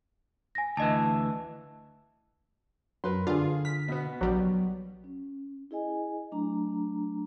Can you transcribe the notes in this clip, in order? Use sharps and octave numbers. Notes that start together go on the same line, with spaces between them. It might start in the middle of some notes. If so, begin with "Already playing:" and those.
G#5 A#6
D2 E3 D#5 A5
F#2 A#4 B4 C6
D3 F4 G#4 F5
F6 B6
B2 B3
A#1 F#3 G3
C#4
E4 G#4 D#5 G#5
F#3 A3 D4 A#5